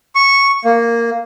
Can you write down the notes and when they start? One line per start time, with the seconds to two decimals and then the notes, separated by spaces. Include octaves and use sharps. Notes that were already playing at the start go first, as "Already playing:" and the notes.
0.15 C#6
0.65 A#3